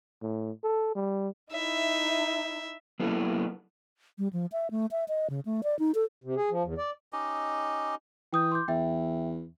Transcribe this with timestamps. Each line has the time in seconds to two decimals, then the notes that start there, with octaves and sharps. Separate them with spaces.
0.22 A2
0.64 A4
0.95 G3
1.52 D#4 E4 E5
3.00 F#3 A#3 B3 E4 A4
4.18 G3
4.33 F3
4.52 E5
4.71 A3
4.91 E5
5.08 D#5
5.30 C#3
5.45 A3
5.63 D5
5.79 D#4
5.95 A4
6.24 C3
6.36 G#4
6.51 F3
6.63 E2
6.78 D5
7.13 C#4 D#4 G4 D#5
8.33 E3 G5 D#6 G6
8.52 C6 D6 G6
8.68 E2 E5 G5